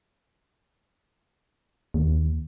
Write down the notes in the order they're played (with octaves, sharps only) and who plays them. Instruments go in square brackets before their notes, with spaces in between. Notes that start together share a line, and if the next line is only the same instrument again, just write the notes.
[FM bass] D#2